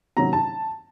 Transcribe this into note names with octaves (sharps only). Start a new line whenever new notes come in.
C3 D#3 F#3 A#3 C#4 A#5
A5